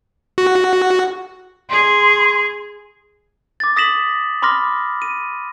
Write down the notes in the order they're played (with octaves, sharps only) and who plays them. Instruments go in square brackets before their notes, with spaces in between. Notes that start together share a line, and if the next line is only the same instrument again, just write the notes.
[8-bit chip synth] F#4
[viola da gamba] G#4 [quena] C6
[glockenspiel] D6 A6
D#6 A#6 B6 E7 F#7
B5 C6 D6 F6 A#6
D#7